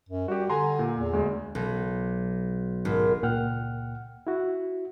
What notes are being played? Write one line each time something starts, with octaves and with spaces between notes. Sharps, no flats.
F#2
G3 F#4 G4
D3 G#5 A#5 C6
A#2
E2
D2 G#3
B1
G#1
C#2 A#2 F#5 G5 F6
E4 F#4